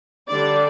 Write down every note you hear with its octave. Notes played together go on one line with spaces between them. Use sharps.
D3 G3 D4 D5